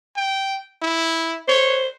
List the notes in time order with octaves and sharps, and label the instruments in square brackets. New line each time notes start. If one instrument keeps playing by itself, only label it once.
[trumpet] G5
E4
[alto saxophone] C5 [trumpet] C#5